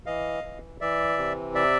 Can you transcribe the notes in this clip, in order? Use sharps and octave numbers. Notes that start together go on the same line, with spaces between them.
E3 D#5 F5
E3
E3 D5 E5
C3
D5 E5